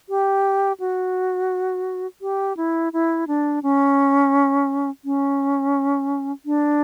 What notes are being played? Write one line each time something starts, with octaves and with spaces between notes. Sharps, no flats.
G4
F#4
G4
E4
E4
D4
C#4
C#4
D4